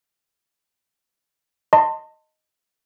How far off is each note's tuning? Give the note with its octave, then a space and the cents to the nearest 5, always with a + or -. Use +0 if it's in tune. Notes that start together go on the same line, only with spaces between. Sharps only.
D#5 +0 A5 +30 C6 +0